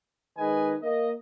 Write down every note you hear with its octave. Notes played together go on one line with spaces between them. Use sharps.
D#3 G#3 D#4 B4 D#5 G#5
A#3 D#5